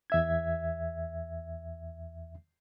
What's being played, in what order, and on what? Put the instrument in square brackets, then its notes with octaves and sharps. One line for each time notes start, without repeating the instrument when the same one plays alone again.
[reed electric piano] E2 E5 G#6